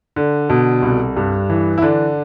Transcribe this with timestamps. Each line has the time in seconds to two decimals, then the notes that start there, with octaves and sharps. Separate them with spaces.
0.16 D3
0.49 B2 A4
0.82 C2
1.17 G2
1.50 E3
1.78 E4
1.82 D3 D4